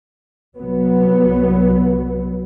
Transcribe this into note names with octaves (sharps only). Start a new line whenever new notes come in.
C2 F#3 B3